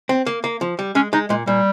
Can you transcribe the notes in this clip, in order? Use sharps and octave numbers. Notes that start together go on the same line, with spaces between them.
C4
A#3
A#3
F3
G3
G#3 C#4
G#3 D#4
A#2 G#3
A#2 G3